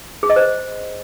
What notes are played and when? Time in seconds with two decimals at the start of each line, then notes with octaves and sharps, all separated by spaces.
0.23 G#4
0.30 D#5
0.36 C5